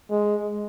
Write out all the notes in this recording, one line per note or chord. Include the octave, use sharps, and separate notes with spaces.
G#3